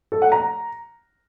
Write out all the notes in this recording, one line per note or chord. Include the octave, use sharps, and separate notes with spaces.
A4
F#5
A#5